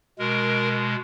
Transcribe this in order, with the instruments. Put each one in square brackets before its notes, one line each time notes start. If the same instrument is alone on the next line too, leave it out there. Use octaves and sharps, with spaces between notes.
[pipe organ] B2 G#3 A#4